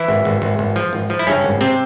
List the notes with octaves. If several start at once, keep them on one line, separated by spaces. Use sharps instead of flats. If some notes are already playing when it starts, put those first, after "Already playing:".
Already playing: E3 E4
G#1
G#1
G#1
G#1
F3
G#1
F3
E4
G2 C#3 C#4
G#1
C3 C4